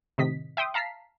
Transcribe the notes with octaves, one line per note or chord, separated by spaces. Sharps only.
A2 C3 D#3 D#5 B6
E5 G5 C6 D#6
F5 A5 A#5 B6 C7